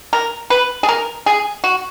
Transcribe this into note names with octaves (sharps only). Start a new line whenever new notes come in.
A#4
B4
G#4
A#4
G#4
F#4